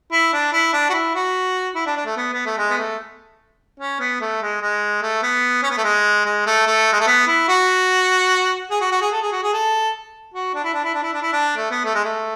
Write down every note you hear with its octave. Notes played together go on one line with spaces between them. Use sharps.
E4
D4
E4
D4
F#4
E4
F#4
E4
D4
D4
A3
B3
B3
A3
G#3
B3
A3
C#4
B3
A3
G#3
G#3
A3
B3
C#4
B3
A3
G#3
G#3
A3
A3
G#3
A3
B3
E4
F#4
G#4
F#4
F#4
G#4
A4
G#4
F#4
G#4
A4
F#4
D4
E4
D4
E4
D4
E4
D4
E4
D4
A3
B3
A3
G#3
A3